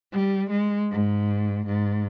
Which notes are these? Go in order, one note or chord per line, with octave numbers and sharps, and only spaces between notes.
G3
G#3
G#2
G#2